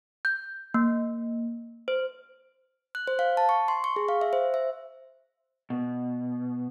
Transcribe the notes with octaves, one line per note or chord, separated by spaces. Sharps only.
G6
A#3
C5
F#6
C5
F5
A5
C#6
C6
C#6
G#4
F5
E5
C5
E5
B2